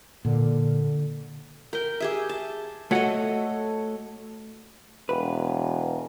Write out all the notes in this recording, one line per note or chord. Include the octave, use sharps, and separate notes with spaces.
A#2 D3
A#4 G5
G4 G#4 E5
A5
A3 F#4 A4 C#5 D#5 F#5
E1 B4